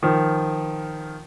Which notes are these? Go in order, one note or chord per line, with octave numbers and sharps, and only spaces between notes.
D#3 F3